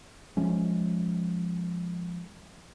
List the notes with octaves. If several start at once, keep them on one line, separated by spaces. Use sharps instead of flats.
F3 G#3 C#4